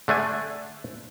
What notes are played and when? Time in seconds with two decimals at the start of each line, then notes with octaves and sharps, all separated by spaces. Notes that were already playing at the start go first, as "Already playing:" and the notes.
0.08 D3 A3 D4 G#5